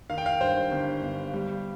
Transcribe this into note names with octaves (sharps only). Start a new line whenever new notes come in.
D#3 F5
G5
F5
G2 C5
G1
G1
G3